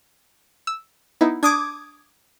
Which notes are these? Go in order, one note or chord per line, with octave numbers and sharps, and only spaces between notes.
E6
B3 D#4 E4
D4 D6 D#6 G#6